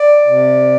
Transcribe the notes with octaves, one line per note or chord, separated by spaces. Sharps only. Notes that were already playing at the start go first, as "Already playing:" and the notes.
Already playing: D5
C3